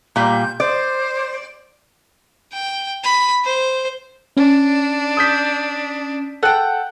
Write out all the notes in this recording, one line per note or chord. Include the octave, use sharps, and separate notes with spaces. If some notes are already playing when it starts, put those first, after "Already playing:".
A#2 G3 G6
C5 D5
G5
B5
C5
C#4 D4
D#6 G6 B6
A4 F#5 G5